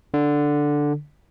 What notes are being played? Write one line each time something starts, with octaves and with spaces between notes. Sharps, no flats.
D3